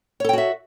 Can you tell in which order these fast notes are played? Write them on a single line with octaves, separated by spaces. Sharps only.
C#5 A4 G5 F#4 E5